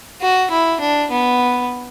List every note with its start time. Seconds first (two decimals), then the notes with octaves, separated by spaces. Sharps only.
0.21 F#4
0.51 E4
0.80 D4
1.10 B3